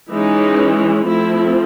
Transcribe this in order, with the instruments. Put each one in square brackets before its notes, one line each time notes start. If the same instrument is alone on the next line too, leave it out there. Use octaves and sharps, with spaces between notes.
[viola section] E3 G#3 C#4 D#4
F3 A3 C4 E4